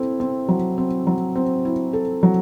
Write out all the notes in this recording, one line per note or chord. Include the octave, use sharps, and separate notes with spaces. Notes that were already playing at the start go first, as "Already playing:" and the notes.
Already playing: C4 E4 A4
C4
F#3
C4
F#3
C4
E4
A4
F#3